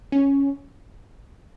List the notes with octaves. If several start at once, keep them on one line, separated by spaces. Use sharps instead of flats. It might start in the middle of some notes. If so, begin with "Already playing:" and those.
C#4